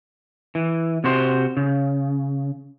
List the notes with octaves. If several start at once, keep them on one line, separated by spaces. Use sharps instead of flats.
E3
C3 F#4 C5
C#3